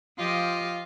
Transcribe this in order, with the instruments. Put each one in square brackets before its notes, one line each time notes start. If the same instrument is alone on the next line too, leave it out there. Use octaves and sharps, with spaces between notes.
[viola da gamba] F3 G4 D#5 [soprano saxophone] F4